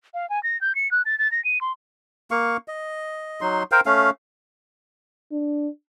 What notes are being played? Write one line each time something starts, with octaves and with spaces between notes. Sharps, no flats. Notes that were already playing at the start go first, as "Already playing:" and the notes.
F5
G#5
A#6
G6
C#7
F#6
A6
A6
A#6
D#7
C6
A#3 F5 C#6
D#5
F#3 D#4 C6
A#4 C5 F5 G5
A3 C#4 F5
D4